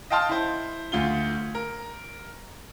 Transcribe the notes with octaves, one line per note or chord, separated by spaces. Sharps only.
D#5 F5 G5 A5 C6 F6
E4 C5
D2 F4 G7
A#4